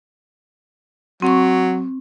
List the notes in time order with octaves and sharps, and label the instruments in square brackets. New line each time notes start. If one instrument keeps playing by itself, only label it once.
[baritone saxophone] F#3 [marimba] C4 C#6